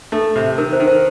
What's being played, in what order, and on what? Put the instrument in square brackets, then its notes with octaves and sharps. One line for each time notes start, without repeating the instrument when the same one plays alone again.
[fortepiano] A3 [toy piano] A4
[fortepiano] C3
[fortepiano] D#3 [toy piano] A#4
[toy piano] C5
[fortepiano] D#3
[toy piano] C5